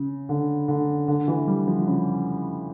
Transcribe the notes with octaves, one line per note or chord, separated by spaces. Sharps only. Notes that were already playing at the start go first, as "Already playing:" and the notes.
Already playing: C#3
D3
D3
D3
E3
G3
F3
C#3